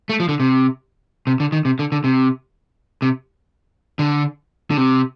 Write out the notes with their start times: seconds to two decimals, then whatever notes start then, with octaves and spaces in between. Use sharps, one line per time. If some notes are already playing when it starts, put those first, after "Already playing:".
0.09 A3
0.20 F3
0.29 D3
0.40 C3
1.27 C3
1.40 D3
1.52 D#3
1.65 C3
1.79 D3
1.92 D3
2.04 C3
3.02 C3
3.99 D3
4.70 D3
4.77 C3